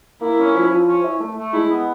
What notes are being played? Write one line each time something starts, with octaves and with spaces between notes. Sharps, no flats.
A#3 E4
C#4
F3
F3
C#4
E4
A3
A3
G#3 E4
B3